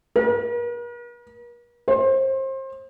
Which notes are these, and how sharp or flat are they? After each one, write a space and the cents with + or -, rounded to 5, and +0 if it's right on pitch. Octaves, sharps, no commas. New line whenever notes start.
A#4 +45
C5 +30